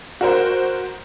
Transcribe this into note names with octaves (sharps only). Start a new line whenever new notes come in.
F#4 A#4 C5